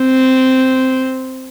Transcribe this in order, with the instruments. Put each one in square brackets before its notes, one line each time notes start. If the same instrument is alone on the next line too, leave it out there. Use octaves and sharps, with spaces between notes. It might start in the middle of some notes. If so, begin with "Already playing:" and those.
Already playing: [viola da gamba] C4